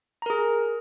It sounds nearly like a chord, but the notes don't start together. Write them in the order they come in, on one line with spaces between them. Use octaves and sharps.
A#5 A#4 G#4